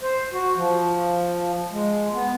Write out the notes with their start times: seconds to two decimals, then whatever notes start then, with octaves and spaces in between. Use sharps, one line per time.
0.01 C5
0.33 F#4
0.56 F3
1.72 G#3
2.13 B3